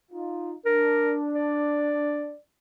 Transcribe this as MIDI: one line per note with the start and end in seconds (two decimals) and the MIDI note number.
0.12 0.54 63
0.12 0.54 65
0.66 2.32 62
0.66 1.16 70
1.34 2.37 74